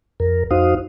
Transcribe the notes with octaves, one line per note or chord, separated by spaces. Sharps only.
F2 A#4
F2 D#4 F#4 C5 F5 D#6